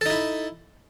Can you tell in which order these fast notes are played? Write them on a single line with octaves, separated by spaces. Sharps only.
A4 D#4 E4